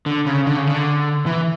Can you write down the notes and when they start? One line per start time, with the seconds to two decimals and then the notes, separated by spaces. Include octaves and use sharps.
0.06 D3
0.26 C#3
0.47 D3
0.57 C#3
0.67 D3
1.26 E3